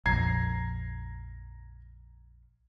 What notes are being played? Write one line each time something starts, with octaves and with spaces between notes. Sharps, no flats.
A#1 F2 A#5 G#6 C7